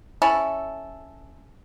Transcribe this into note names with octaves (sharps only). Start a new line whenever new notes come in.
C#4 E4 A4